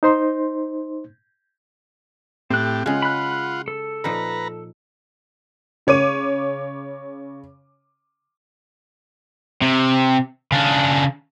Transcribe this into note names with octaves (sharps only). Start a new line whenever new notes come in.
D#4 C5 C6
A2 C4 G4 F#6
C#3 G#3 F4 F#5
B5 F#6
A4
A#2 F3 D#4 B4 A#5
C#3 C#5 D6 D#7
C3
C#3 D4